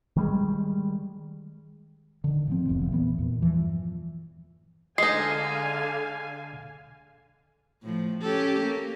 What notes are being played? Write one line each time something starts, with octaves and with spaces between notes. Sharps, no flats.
D#3 G3 G#3
D3 D#3
G#2 F3 C4
F1 B1 E2
A#2 E3 B3
E2 A#2
G2 E3 F3
D3 G#3 D#4 F5 G#5 C7
A2 F3
C#4 G4 A4
A#3